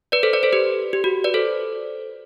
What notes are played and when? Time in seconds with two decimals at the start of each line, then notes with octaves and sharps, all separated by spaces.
0.12 B4 D5
0.23 A4 C5
0.33 B4 D5
0.43 A4 C5
0.53 G4 B4
0.93 G4
1.04 F#4
1.24 B4 D5
1.34 A4 C5